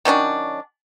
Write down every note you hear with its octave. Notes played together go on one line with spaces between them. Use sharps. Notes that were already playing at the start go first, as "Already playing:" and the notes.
D#3 F#3 C#4 D4